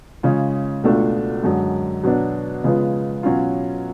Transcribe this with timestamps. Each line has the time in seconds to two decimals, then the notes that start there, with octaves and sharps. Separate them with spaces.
0.23 C#3 G#3 C#4 F4
0.83 C#2 B2 A3 D4 F4
1.43 F#2 D3 G#3
2.03 B2 F#3 B3 D4
2.64 C#3 F3 G#3 B3 F4
3.23 B2 F#3 C#4 F4